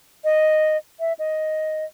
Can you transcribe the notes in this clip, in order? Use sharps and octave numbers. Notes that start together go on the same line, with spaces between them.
D#5
E5
D#5